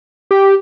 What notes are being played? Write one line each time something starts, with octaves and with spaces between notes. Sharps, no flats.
G4